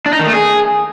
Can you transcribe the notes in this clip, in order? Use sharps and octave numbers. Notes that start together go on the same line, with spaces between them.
D4
D#4
D#3
A3
G#4